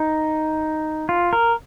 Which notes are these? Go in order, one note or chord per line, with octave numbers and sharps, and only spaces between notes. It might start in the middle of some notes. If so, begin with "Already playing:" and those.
Already playing: D#4
F4
A#4